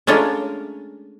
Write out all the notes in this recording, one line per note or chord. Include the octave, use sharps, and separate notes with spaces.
G#3 A3 C#4 D4 F4 A#4